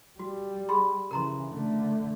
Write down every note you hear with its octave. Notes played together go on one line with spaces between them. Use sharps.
G3 F#4
G#4 B5 C6
C#3 E3 A#4 A#5 C6
D3 A3